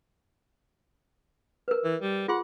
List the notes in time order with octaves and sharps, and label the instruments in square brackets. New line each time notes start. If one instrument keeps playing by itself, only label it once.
[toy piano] A#4 B4
[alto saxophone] E3
G3
[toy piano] F4 G#4 C6 [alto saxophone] F#5